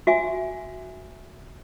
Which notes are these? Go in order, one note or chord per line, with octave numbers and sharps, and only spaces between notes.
F#4 E5 G#5